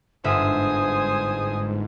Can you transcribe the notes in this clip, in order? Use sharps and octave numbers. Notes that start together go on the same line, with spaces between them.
G1 G#2 C5 E5 G#5 D#6